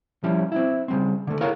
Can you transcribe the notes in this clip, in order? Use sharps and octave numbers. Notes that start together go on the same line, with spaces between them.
F3 G3 C#4 E4
C4 E4
C#3 G3 C4
D3 A3
E4 G#4 A#4 C#5 F5